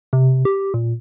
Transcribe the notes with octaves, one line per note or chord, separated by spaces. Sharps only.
C3
G4
A#2